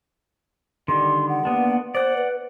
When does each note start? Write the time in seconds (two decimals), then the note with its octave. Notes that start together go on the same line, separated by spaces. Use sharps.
0.88 D3 D#3 G3 C6
1.29 F#5
1.45 A#3 B3 D4
1.95 C5 D5 F#5
2.17 B4